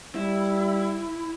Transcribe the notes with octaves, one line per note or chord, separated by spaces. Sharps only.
G3 E4